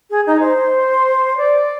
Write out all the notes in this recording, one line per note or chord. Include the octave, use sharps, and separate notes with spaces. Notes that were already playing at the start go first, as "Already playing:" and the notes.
G#4
D#4
C5
D5